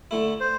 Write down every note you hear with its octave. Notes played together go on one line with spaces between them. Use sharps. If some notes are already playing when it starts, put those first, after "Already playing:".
D3 A3 E4
C5